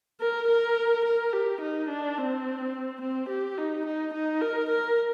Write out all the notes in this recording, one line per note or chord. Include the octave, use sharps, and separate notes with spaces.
A#4
A#4
A#4
G4
D#4
D4
C4
C4
G4
D#4
D#4
D#4
A#4
A#4